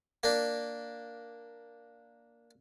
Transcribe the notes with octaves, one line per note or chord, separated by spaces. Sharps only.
A#3 D4